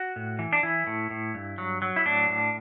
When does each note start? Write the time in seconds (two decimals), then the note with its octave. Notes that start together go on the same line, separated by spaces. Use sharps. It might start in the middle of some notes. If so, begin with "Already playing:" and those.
Already playing: F#4
0.16 A2
0.39 E3
0.53 D4
0.63 E3 E4
0.87 A2
1.10 A2
1.34 G2
1.58 F#3
1.82 F#3
1.96 E4
2.06 A2 D4
2.29 A2